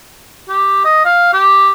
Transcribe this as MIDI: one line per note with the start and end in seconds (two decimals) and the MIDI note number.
0.49 0.81 67
0.85 1.05 75
1.05 1.32 77
1.33 1.71 67